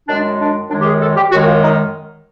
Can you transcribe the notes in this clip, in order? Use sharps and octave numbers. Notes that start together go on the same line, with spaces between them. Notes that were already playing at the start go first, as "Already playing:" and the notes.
F#2 D#3 G#3 D4
D4
F#2 D#3 G#3 D4
G4
G#4
A4
G4
F#2 D#3 G#3 F#4
F4
D#4